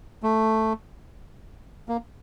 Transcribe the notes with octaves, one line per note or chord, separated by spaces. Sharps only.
A3
A#3